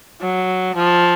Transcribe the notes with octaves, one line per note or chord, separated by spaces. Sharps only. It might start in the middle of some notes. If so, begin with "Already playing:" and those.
F#3
F3